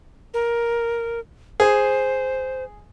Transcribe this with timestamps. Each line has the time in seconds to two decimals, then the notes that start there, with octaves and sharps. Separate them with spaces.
0.34 A#4
1.60 G#4 C5